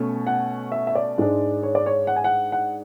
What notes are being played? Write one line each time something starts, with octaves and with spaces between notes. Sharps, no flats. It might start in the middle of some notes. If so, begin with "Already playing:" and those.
Already playing: B2 A3 C#4
F#5
E5
E5
D5
G#2 G#3 D4
C#5
D5
C#5
F#5
G#5
F#5
F#5